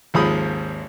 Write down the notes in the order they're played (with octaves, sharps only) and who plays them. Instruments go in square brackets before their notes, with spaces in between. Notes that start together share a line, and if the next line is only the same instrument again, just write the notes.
[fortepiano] G#1 D#2 F3 G#3 B5 D#6